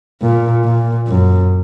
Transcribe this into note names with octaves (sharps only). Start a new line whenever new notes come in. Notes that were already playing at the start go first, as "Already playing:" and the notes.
A#2
A#2
F#2